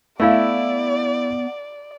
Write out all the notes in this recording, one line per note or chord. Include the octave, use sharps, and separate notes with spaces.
A3 B3 E4 D5 E5 F5